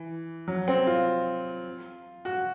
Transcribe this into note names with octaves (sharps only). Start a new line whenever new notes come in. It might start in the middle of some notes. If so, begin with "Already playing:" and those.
Already playing: E3
F#3
C4
F4
F#4